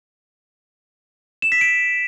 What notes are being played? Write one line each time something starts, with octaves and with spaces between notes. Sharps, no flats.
E7
B6
D7